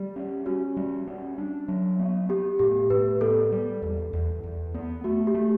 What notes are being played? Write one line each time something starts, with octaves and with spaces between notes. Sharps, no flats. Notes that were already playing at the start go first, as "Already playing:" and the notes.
Already playing: G3 G4
C#4
C#4 F#4
G3
C#4
D4
F#3
B3
B3 G4
A2 G4
A2 B4
B3 A4
G3
E2
E2
E2
B3
A3 F#4
G4
A3